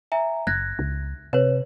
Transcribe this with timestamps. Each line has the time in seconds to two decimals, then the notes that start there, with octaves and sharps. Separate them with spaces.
0.12 E5 G#5 A#5
0.47 F#1 F#6 G#6 A#6
0.79 C#2
1.33 C3 B4 C#5